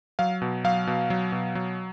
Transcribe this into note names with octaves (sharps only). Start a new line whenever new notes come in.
F#3 F5
B2
F#3 F5
B2
F#3
B2
F#3